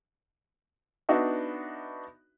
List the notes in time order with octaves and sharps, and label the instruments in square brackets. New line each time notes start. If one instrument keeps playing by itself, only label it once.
[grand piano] B3 D4 D#4 F#4 E5